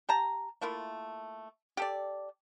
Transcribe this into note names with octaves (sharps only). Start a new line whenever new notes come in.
G4 A5 A#5
A3 A#3 E4 F4
G4 A4 D5